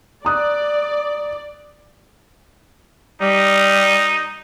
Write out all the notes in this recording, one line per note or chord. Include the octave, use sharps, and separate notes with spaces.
D5 A#5 D#6 F#6
G3 D#4